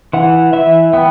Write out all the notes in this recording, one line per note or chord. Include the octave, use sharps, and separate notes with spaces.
E3 F#5
E3 E5
B3 G5